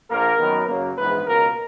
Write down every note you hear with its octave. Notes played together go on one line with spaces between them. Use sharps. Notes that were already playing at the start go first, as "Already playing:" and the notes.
A#1 A#2 A#3 A#4
F#2 D#3 F#3 B3
F#2 C#3 F#3 A#3
A#1 G#2 E3 G#3 B3 B4
C#2 B2 A#3 A#4